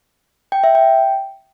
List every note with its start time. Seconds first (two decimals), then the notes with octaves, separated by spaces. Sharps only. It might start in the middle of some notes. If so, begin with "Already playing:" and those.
0.52 G5
0.64 E5
0.75 G5